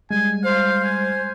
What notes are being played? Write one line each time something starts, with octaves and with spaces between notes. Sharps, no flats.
G3 G#3 G#5
C5 F5
G#5